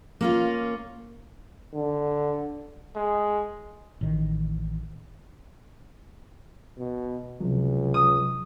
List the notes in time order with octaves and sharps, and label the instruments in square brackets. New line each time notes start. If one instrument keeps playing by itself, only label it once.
[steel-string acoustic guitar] A#3 C#4 F4
[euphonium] D3
[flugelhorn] G#3
[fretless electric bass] A1 D#3
[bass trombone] B2
[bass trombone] C#2 [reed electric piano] C3 F3 F#3
[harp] D#6